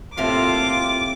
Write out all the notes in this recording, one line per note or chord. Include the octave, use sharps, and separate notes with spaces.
A2 C3 A#3 C4 F4 A4 F5 D6